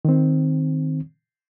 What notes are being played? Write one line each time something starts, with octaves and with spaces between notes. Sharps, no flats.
D#3 C4